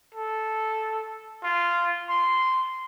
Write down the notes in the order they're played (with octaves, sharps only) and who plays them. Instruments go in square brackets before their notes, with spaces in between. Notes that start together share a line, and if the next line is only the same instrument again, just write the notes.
[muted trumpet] A4
F4
C6